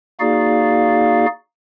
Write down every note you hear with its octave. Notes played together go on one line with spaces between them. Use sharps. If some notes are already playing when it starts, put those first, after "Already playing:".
A#3 D#4 F#4 G#4 D5 F5